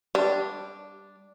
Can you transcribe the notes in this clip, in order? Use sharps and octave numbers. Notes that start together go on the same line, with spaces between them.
G3 D4